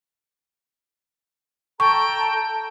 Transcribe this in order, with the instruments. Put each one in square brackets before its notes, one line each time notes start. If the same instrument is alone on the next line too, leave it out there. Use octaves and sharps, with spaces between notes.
[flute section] A4 A5 A#5 [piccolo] G5 [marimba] C#6